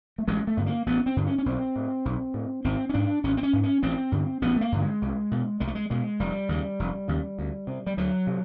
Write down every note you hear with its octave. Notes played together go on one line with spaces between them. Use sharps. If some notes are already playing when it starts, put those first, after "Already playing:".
A3
A1 G#3
A3
G2 D3 B3
A#3
A1 B3
C4
G2 D3
C#4
C#4
B1 C4
A2
B1
A2
G#1 C4
C#4
G#2 D4
G#1 C#4
C4
C#4
G#2
C#4
A1 C4
G2 D3
A1 B3
A3
A#3
G2 D3
G#3
C2
B2
C2 G#3
A3
G#3
B2 G#3
F1 G3
D#2 C#3
F1
D#2 C#3
D2
C3
G3
D2 F#3
C3